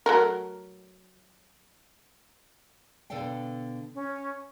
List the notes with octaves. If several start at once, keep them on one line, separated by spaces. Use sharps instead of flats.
F#3 A3 A#4
B2 D3 A4 D5 F5 G5
C#4